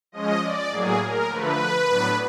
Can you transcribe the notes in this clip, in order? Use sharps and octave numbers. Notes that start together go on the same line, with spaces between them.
F3 G#3 C#4 D#5
D5
A2 F#3 A#3 G#4
A#4
D3 F3 A3 B4
A2 F#3 B3 D4